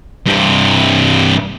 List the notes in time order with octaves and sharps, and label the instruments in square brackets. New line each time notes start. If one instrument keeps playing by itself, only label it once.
[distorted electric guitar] G2 C3